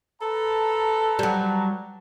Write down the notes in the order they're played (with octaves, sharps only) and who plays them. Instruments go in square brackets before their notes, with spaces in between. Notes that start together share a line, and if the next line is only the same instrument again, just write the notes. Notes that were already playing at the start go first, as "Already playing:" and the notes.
[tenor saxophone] A4 [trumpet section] B4 A5 A#5
[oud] F#3 G3